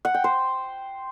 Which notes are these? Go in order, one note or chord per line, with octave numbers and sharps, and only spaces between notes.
F#5
G5
C5